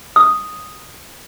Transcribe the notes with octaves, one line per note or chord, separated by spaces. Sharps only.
D#6